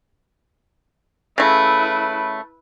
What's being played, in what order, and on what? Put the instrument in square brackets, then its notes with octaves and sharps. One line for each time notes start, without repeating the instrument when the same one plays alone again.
[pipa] C#3 A3 [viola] E4 B4